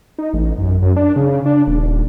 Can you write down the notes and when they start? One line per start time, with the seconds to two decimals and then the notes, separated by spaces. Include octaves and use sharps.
0.18 D#4
0.34 A1
0.58 F#2
0.82 F#2
0.96 D4
1.16 C#3
1.46 D4
1.67 D#1